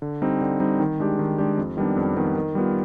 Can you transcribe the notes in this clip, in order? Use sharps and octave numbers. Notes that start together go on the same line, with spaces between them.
D3
G3 C4 D#4
D3
G3 C4 D#4
D#3
G#3 D4 G4
D#3
G#3 D4 G4
F2
D#3 G3 B3 D4
F2
D#3 G3 B3 D4
D#3
G3 B3 F4